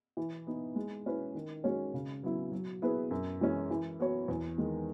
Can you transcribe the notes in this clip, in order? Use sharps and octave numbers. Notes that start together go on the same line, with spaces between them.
E3
B3 D#4
G#3
C#4 E4 B4
D#3
G#3 C#4 F#4 C#5
C#3
F#3 B3 E4
F#3
B3 E4 G#4 B4
F#2
E3 G#3 C#4 G#4
E3
B3 F#4 C#5
E2
D#3 G#3